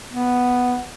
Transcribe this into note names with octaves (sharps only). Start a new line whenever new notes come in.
B3